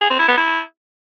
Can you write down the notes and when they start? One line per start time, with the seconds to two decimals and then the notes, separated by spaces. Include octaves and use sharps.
0.01 G#4
0.10 C4
0.19 E4
0.28 B3
0.37 E4